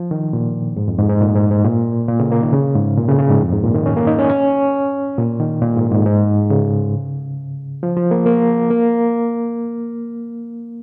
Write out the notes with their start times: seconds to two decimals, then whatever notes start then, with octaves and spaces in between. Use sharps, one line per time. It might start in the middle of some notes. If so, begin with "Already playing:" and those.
Already playing: F3
0.11 D#3
0.33 A#2
0.76 G#2
0.88 F2
0.99 G#2
1.09 G#2
1.21 A#2
1.35 G#2
1.51 G#2
1.64 A#2
2.09 A#2
2.20 C#3
2.32 A#3
2.42 D#3
2.53 C#3
2.75 G#2
2.97 A#2
3.08 C#3
3.19 C#3
3.30 G#2
3.41 F2
3.53 G#2
3.63 A#2
3.74 D#3
3.86 C#4
3.97 A#3
4.07 D#4
4.19 C#4
4.29 C#4
5.18 A#2
5.40 D#3
5.62 A#2
5.76 G#2
5.91 G#2
6.06 G#2
6.50 C#3
7.83 F3
7.96 F3
8.11 A#3
8.26 A#3
8.70 A#3